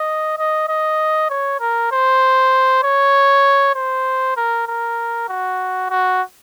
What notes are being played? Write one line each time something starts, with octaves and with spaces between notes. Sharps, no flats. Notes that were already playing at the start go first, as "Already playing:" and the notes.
Already playing: D#5
D#5
D#5
C#5
A#4
C5
C#5
C5
A#4
A#4
F#4
F#4